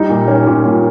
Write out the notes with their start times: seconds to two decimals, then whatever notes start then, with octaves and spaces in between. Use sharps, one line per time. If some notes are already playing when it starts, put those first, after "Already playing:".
Already playing: G3 D#4
0.09 A#2
0.28 C#4
0.47 A#2
0.66 A#2